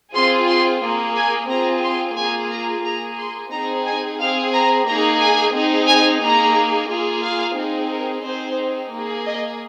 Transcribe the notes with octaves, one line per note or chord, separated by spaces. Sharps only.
C4 F4 G#4 C6
C6
A#3 G#4
G#5
C4 F4 G#4 A#5
C6
A#3 F4 G#4 G#5
A#5
A#3 G#4 A#5
C6
C4 D#4 G#4 A#5
G#5
C4 G#4 F5
A#5
A#3 D#4 G#4 A#5
G#5
C4 D#4 G#4
G#5
A#3 D#4 G#4 A#5
A#3 F4 G#4
F5
C4 D#4 G#4
A#4
C4 D#4 G#4 C5
A#3 G#4
D#5